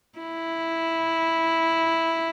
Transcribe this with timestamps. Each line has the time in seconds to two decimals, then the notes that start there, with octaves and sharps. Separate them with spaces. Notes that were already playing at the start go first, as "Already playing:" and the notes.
0.19 E4